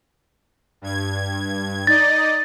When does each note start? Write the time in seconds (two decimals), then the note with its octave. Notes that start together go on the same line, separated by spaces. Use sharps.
0.82 G2 G#6
1.87 D#4 D5 D#5 A6